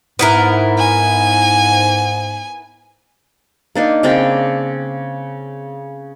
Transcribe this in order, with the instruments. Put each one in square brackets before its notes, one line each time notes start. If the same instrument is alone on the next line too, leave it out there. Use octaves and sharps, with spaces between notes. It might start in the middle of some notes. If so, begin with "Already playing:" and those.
[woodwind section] G#2 [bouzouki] B3 E4 A#4
[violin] G#5
[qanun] A#3 D4 D#4
C#3 C4 D4 G5